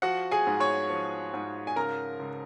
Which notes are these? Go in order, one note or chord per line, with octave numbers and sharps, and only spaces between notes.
F3 F#4 F#5
G#4 G#5
G#2
C#5 C#6
F3
G#2
G#5
C#3 A#4 A#5
C#2